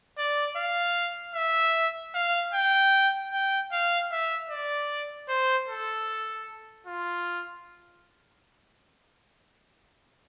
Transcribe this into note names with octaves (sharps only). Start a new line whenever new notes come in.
D5
F5
E5
F5
G5
G5
F5
E5
D5
C5
A4
F4